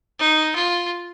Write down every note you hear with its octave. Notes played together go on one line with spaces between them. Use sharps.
D#4
F4